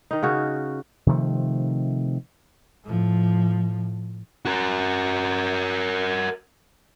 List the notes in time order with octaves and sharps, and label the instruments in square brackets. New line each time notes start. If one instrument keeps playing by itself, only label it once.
[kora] D#3 D#4
C#3 C#4 F#4
[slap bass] C3 D#3 F3 A3
[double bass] A2 F3
[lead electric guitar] F#4 A#4